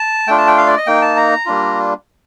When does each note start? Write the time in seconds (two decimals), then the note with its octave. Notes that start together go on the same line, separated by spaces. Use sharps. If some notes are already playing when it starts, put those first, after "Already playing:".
Already playing: A5
0.28 A3 D4 F4 G5
0.38 A5
0.47 G5
0.57 F5
0.67 D5
0.77 D#5
0.87 A#3 D#4 G5
1.02 A5
1.17 A#5
1.46 G3 A#3 D4 F4